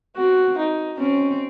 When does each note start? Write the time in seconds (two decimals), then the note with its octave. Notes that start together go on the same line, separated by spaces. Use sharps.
0.16 C4 F#4
0.58 D#4
0.99 C4 C#4